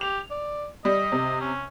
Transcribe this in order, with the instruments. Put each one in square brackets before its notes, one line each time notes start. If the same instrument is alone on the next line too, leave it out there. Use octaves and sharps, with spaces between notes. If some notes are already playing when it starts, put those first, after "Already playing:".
[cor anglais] G4 [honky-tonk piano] F7
[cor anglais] D5
[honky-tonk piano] G3 [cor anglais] D#5
[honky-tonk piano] C3
[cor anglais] C#4